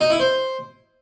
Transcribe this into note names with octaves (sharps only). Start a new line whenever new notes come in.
D#4
E4
C5